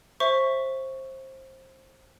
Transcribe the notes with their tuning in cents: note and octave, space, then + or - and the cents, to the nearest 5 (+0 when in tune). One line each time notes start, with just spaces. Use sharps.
C5 +20 E5 +0 C#6 +0